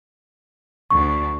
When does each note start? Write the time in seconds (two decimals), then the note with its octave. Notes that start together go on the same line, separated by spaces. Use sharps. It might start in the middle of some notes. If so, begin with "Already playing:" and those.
0.90 D2 D4 C#6